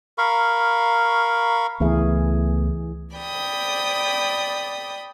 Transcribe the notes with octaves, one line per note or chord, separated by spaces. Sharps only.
A#4 F5 B5 C#6
C#2 E3 A3 B3 G#4
D5 G5 B5 D#6